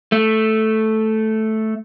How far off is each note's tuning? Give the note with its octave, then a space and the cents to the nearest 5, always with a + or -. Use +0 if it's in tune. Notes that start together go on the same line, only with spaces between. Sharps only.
A3 -5